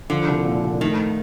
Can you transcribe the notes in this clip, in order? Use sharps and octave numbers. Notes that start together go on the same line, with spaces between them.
D3 F3
C2
A#2
C2
D#3 A3